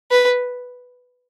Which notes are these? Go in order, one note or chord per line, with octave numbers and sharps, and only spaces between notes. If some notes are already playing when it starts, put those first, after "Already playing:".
B4